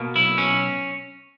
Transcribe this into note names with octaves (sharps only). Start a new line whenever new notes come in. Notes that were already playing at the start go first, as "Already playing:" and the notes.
Already playing: B2 A#3
B1 E4
C#4